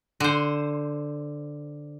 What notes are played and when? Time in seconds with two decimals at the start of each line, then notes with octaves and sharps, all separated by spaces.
0.20 D3 C5